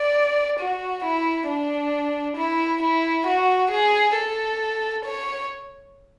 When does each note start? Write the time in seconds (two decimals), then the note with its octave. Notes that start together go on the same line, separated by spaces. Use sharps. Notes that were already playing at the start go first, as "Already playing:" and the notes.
Already playing: D5
0.59 F#4
1.04 E4
1.48 D4
2.37 E4
2.82 E4
3.26 F#4
3.71 G#4
4.16 A4
5.05 C#5